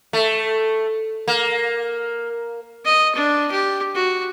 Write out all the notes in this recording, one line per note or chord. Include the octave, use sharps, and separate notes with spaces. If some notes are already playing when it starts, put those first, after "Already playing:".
A3
A#3
D#5
D4
G4
F#4